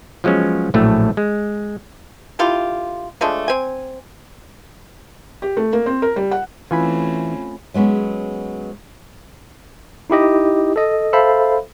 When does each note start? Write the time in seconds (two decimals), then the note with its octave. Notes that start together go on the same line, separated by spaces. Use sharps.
0.24 F3 F#3 G#3 B3 C#4
0.74 A#1 A2 F#3 A3
1.17 G#3
2.39 D3 E4 F4 G4
3.21 F3 G#3 A3 D4
3.48 C4 G#5
5.42 G4
5.57 A3
5.73 A#3
5.86 C4
6.02 A#4
6.16 G3
6.31 F#5
6.71 E3 A3 C4 C#4 F4 G#5 B5
7.74 F#3 G#3 B3 C#4
10.10 D#4 E4 G4 D#5
10.76 A4 D#5
11.13 A4 C5 E5 F5 B5